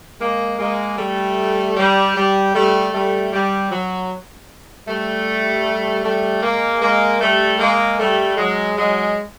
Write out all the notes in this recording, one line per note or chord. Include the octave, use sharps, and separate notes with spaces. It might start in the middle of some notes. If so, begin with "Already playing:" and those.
G#3 A#3
G#3 A#3
G3 A3
G3
G3
G3 A3
G3 A3
G3
F#3
G3 A3
G3 A3
G#3 A#3
G#3 A#3
G3 A3
G#3 A#3
G3 A3
F#3 G#3
F#3 G#3